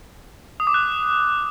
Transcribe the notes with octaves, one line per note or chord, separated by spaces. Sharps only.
D#6
D6
F#6